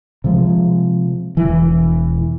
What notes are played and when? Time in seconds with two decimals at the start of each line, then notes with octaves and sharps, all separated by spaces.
0.24 C3 F3 G#3
1.37 E1 E3